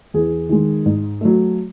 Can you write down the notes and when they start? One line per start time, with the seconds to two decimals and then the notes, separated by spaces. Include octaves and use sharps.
0.14 E2 G#4
0.49 D#3 G#3
0.86 G#2
1.21 F#3 A3